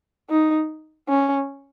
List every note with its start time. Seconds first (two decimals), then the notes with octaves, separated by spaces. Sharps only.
0.30 D#4
1.08 C#4